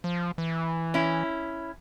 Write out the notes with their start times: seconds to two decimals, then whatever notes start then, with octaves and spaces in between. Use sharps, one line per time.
0.04 F3
0.38 E3
0.94 C#4 E4